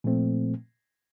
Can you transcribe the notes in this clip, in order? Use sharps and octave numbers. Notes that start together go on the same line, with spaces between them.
A#2 F3 A3 C4